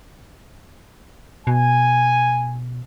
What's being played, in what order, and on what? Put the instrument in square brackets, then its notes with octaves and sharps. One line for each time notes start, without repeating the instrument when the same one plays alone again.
[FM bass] B2 [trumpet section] G#5